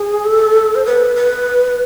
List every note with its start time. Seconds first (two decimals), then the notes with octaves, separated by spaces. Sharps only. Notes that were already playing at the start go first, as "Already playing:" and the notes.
Already playing: G#4
0.24 A4
0.75 C5
0.85 B4
1.16 B4